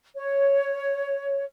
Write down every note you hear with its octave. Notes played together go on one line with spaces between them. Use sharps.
C#5